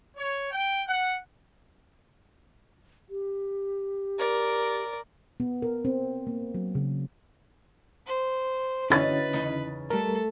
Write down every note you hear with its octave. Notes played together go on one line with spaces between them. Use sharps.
C#5
G5
F#5
G4
A#4 D5
B3
A#4
C4
A#3
F#3
C#3
C5
D3 C#4 D#4 E4 F#4 B4 C#5 A6
E2 C#3 D#4
G3 A3 A4 A#4